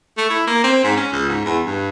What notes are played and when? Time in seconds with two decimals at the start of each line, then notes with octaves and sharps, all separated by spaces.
0.17 A3
0.30 E4
0.48 A#3
0.64 C4
0.84 G#2
0.97 C#4
1.12 C#2
1.29 G#2
1.45 E2
1.66 G2